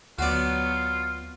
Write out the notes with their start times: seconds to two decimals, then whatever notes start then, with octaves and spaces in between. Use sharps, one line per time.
0.19 D2 F#3 B3 F4 F#4 D5